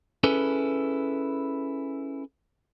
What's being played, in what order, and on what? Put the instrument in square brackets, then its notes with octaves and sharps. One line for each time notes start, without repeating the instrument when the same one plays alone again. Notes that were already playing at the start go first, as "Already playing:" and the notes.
[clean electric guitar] C#4 E4 G#4 A4 B4